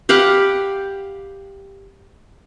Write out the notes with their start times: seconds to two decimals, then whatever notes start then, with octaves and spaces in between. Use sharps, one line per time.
0.09 G4 F5 F#5 B5